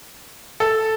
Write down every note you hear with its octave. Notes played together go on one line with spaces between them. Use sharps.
A4